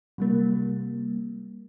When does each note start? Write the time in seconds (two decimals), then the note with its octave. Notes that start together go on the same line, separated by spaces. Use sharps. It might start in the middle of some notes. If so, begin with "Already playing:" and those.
0.18 C3 G3 A#3